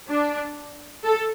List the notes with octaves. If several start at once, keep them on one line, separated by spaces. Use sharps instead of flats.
D4
A4